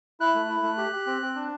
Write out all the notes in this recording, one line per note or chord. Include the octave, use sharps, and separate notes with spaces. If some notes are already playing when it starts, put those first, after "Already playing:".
E4 F#6
A3
E4
A3
G4
G4
C4
C4
D4